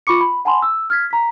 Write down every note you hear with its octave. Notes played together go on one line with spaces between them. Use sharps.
F4 B5 C#6 D6 C#7
B5
F#5 G#5 A5 B5 C6
E6
F6 G#6 B6
A#5 B6